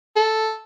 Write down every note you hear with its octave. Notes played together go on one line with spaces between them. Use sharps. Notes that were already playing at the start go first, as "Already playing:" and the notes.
A4